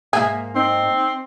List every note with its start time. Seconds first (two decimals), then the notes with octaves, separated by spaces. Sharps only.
0.13 G#2 A#3 G#4 E5
0.55 C4 D#4